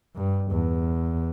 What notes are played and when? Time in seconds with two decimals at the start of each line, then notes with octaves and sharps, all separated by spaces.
0.16 G2
0.51 E2